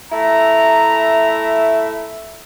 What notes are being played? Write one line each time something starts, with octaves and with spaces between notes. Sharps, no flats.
A3 E4 E5 A#5